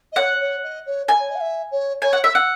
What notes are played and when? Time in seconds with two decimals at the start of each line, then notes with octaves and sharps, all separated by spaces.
0.12 D#5
0.16 C#5 F#5
0.39 C#5
0.63 D#5
0.86 C#5
1.08 D#5 G#5
1.19 C#5
1.30 D#5
1.35 F#5
1.40 E5
1.71 C#5
2.02 C#5 G#5
2.13 F#5
2.24 E5
2.35 F#5